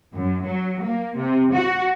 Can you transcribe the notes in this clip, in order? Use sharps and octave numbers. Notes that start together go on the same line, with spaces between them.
F#2
F#3
A#3
C3
F#4